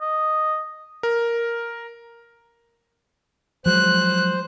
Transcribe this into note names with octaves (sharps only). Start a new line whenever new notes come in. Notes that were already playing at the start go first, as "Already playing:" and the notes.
D#5
A#4
F3 F#3 G#3 C5 F#6